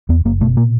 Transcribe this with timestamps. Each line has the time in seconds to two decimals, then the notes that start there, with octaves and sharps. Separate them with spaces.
0.09 E2 B3
0.25 F#1 A#3
0.41 B2 A3
0.56 A#2 A#3